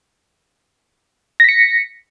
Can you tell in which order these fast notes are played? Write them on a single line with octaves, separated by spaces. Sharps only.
A#6 B6 C#7